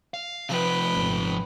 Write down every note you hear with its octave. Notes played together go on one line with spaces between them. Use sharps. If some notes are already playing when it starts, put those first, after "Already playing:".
F5
C3 F3 B4 G5
D#1 G#1